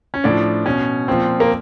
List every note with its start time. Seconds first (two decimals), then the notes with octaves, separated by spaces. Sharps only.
0.14 C#4
0.24 A2 F3 D4
0.66 B2 C#4
1.08 A#2 F3 C4
1.40 A#3